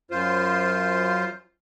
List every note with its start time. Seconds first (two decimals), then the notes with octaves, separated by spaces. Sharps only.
0.11 F#2 F4 C5